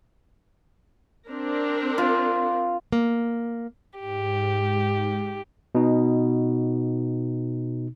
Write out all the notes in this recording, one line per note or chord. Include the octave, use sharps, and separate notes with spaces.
C4 D4 A#4
F4
A#3
G#2 G4
B2 D#4